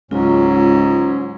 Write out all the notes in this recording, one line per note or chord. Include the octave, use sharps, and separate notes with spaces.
C#2 G#2 F#3 C#4 F4